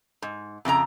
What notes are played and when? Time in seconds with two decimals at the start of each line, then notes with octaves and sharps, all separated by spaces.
0.22 G#2
0.65 F2 C#3 E4 A#5